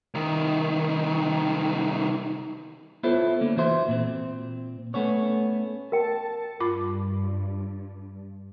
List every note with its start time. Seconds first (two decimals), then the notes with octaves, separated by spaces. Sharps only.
0.14 C2 D#3
3.03 B3 E4 F4 A4 C5 C#5
3.41 D3 A#3
3.57 E3 F#4 C5 E5 C6
3.88 A#2 C4
4.94 A3 B3 C#4 C#5
5.92 A#4 G5 A5
6.60 G2 F4 B5 D6